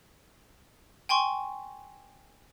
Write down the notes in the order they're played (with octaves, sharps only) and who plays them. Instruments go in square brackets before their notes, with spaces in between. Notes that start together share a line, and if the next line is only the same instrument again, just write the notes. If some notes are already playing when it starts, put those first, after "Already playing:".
[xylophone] G5 G#5 C6 C#6